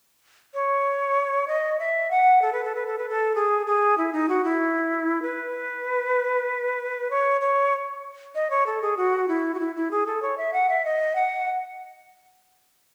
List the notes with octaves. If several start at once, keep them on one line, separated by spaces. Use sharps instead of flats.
C#5
D#5
E5
F#5
A4
B4
A4
B4
A4
B4
A4
G#4
G#4
E4
D#4
F#4
E4
B4
C#5
C#5
D#5
C#5
A4
G#4
F#4
E4
F#4
E4
E4
G#4
A4
C#5
E5
F#5
E5
D#5
F#5